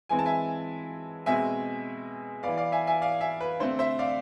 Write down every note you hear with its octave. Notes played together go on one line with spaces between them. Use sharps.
E3 G#3 C4 G#5
A5
E5 G#5
B2 G#3 C4 E5 G#5
E3 B3 D5 F5
D5 F5
E5 G#5
E5 G#5
D5 F5
E5 G#5
B4
D3 A3 C4 C5
C5 E5
D5 F5